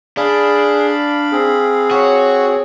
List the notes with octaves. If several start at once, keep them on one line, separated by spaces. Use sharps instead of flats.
D4 G#4 F5 B5
C4 G#4
F#4 C#5